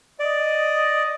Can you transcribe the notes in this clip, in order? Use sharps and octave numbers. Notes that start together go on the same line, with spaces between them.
D5 D#5